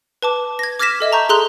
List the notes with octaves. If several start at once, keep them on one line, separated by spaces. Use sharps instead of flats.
B4 A5 D6
G#6 A#6
D6 F6 G#6 A#6 B6 E7
A4 D#5 E5
A5 A#5 C#6 G6
G#4 A4 A#5 C6 F#6 F7